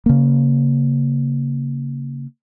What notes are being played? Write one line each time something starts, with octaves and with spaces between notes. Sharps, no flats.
C#3 A#3